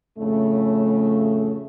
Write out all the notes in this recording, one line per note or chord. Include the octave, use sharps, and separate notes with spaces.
F2 A2 C#3 A3